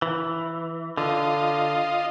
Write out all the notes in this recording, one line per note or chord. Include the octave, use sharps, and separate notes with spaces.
E3
D3 F4 D#5